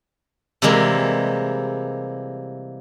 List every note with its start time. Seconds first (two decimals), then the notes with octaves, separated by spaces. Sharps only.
0.62 C3 E3 G3 G#3 A#3